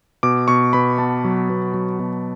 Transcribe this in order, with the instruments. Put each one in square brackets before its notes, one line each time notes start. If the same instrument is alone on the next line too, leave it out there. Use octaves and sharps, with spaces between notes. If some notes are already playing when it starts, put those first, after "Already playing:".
[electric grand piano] B2 D6
B2 C#6
B2 B5
B3 A5
F#3
B2
F#3
B2